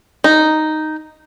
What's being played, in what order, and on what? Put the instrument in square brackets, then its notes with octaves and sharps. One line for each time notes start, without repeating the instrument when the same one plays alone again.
[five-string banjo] D#4